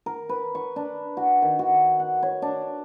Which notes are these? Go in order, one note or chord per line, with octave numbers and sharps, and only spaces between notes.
A#4
B4
C#6
D4
F#4
D#3
F#4
F#5
C#5
D4